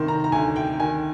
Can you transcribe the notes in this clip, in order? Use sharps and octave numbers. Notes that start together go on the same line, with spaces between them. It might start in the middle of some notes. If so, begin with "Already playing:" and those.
Already playing: C3 D#3 C6
A#5
A#5
D2 G#5
G5
D#3 G#5